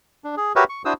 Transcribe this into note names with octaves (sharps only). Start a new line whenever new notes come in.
D4
G#4
F#4 G4 A#4 B4 C#5 E5
C#6
D4 E4 F#4 C5 D#6 E6